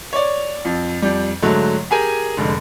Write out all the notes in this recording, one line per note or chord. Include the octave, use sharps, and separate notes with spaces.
C#5 D5
F2
F2 G3
G#2 D3 F#3 A3
G4 G#4 A#4 G#5
F1 G#2 D3